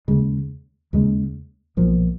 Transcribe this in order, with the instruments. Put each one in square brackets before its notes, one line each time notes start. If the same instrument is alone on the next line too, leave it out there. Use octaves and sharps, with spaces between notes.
[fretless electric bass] D#2 C#3 G#3
D#2 C#3 G#3
B1 A#2 F3